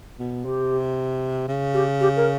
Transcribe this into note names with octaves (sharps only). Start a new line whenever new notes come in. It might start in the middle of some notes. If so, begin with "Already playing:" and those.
B2
C3 G4
C#3
G4
G4
A#4